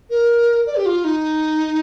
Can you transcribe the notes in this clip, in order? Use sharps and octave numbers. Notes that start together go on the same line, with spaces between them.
A#4
D5
G4
F4
D#4